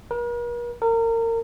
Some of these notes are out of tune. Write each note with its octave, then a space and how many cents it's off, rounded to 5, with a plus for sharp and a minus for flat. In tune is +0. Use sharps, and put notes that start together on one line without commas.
A#4 +45
A#4 -30